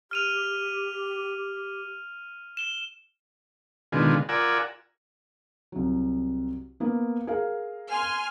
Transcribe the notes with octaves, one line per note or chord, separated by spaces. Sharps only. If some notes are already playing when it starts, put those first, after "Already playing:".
G4 F6 D#7 F7
E7 G7
B2 D3 D#3 G#3 F4
F4 A#4 D5 F#5 G#5 E6
C2 F#3
A#3 B3
G#4 A#4 F5
G#5 C6 F6